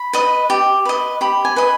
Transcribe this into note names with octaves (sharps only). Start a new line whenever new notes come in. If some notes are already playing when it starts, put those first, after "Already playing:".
Already playing: B5
B4 D#5
G4
B4 D#5
G4 B5
G#5
B4 D#5